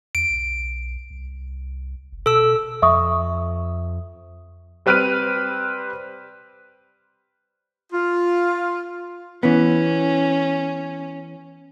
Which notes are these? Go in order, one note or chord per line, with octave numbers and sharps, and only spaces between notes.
E2 D7
B1
C2
F#1
B2 A4 E6
F2 E5 C#6 D#6
G3 C4 B4 F6 F#6 D#7
F4
E3 B3 C#4